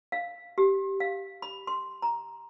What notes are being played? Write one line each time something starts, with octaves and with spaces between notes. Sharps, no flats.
F5
G4
F5
B5
C6
A#5